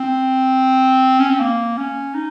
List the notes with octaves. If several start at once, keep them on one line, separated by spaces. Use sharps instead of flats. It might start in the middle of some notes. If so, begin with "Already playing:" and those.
Already playing: C4
C#4
C4
A#3
C#4
D#4